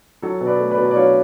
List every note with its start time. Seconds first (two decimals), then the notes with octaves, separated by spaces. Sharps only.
0.22 F#3 A4 C#5
0.41 B2
0.47 B4 D5
0.60 A3
0.71 B4 D5
0.78 B2
0.91 D5
0.96 F#3 C#5 F5